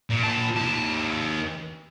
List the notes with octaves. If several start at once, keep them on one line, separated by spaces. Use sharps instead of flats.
A#2
A#2 A5
D#2 A5